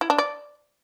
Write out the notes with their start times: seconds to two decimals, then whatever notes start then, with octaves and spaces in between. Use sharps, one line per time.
0.01 E4
0.10 D4
0.18 D5